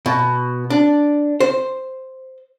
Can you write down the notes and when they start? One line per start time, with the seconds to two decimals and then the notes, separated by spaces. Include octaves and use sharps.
0.06 B2
0.70 D4
1.40 C5